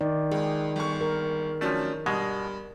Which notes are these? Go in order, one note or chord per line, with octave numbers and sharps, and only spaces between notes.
D#3 D5
C#2 G#4
G1 C#6
A#4
F3 F#3 A3 C#4 D4
G2 B2 G#3